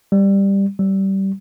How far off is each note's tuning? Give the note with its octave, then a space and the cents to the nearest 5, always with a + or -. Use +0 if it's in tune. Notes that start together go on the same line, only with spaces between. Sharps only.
G3 +10
G3 -20